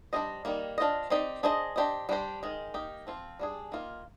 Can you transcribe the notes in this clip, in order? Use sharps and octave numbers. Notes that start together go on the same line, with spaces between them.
G3 D4 G#4 C5 D#5
D#3 G3 A#3
D4 F4 C5 D#5
C4 D#4 G4 D5
D4 G#4 C5 D#5
D4 G4 C5 D#5
G3 D4 G4 C5
D#3 G#3
A#3 D#4 G4
F3 C4 F4
G3 D4 G#4
D#3 A#3 F4